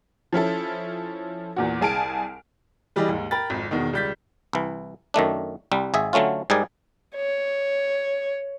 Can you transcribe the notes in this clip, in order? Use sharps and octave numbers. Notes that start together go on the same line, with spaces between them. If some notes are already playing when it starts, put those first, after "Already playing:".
F3 C#4 E4 A4
E2 A#2 F#4
C2 G#4 G#5 A5 F6 D7
E3 G3 G4 G#4 D5 D#5
D#2 G#2
A#4 G5 A#5 B5 A6
G#1 F2
E2 B2 D#3
C#2 G3 D5 G6 A6 B6
C2 E3
F#2 D#3 A3 D4
C2 G3
G#1 G#4 E5
D3 F#3 A3 C#4 F4
G#2 G3 G#4 A#4 D5 G#5
C#5